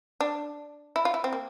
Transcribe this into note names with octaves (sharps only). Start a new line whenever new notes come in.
D4
E4
F4
E4
C4
A#3